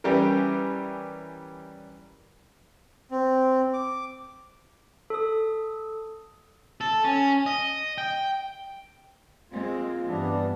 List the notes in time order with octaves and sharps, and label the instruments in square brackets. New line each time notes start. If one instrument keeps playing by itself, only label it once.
[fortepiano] E3 G3 C#4 G4 A#4
[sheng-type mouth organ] C4
D6
[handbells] A4 D#6
[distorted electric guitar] A4
C#4
D#5
G5
[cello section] G#3 A#3 C4 [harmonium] F4
[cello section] G2 E3 [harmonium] G3 B3 D4